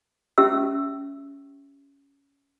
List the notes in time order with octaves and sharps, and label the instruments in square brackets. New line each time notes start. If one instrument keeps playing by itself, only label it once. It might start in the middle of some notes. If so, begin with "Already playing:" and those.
[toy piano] C#4 G4 E5 E6